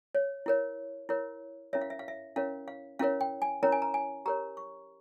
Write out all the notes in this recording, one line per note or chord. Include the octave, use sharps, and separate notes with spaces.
C#5
E4 A#4 C#5
E4 A#4 C#5
C#4 E4 A#4 C#5 E5
F5
E5
F5
E5
C#4 E4 A#4 C#5 F5
F5
C#4 E4 A#4 C#5 F5
G5
G#5
C#4 E4 A#4 C#5 A#5
G#5
A#5
G#5
G4 A#4 C#5 A#5
C#6